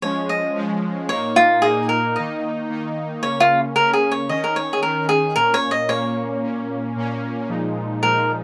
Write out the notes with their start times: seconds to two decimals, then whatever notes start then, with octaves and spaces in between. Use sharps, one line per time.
0.02 F3 G#3 C#4 C#5
0.29 D#5
0.55 F3 G#3 C#4
1.08 A#2 A#3 D#4 C#5
1.36 F4
1.62 A#2 A#3 D#4 G#4
1.89 A#4
2.16 D#3 A#3 D#4 D#5
2.69 D#3 A#3 D#4
3.23 C#3 A#3 C#4 C#5
3.40 F4
3.76 C#3 A#3 C#4 A#4
3.93 G#4
4.12 C#5
4.29 D#3 C#4 D#5
4.44 A#4
4.56 C#5
4.73 G#4
4.83 D#3 C#4 A#4
5.09 G#4
5.36 A#2 A#3 C#4 A#4
5.54 C#5
5.71 D#5
5.89 A#2 A#3 C#4 C#5
6.42 A#2 A#3 C#4
6.96 A#2 A#3 C#4
7.49 A#2 F3 G#3 D#4
8.02 A#2 F3 G#3 D#4 A#4